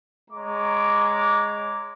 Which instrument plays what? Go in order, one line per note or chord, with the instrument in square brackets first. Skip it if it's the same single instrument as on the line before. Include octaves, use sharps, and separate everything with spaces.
[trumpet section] G#3 C#5 A#5 D6